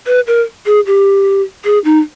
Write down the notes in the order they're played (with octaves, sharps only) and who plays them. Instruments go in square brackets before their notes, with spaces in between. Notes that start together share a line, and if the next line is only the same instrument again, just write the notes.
[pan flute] B4
A#4
G#4
G4
G#4
D#4